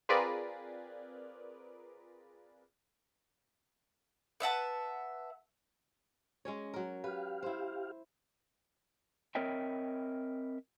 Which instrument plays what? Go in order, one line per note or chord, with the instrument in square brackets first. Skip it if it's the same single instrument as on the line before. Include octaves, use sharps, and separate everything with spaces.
[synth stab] C4 F4 G#4 A#4 B4 D5
[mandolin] B4 E5 F#5 A5
[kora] G#3 C#4 C#5
F#3 A#4
[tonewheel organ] G4 F5 [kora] B4
[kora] E4 C5
[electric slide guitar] C4 A#4 C#5 D#5 E5 G5